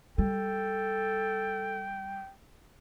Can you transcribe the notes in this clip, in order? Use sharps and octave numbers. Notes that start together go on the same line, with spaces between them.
G3 A4 G5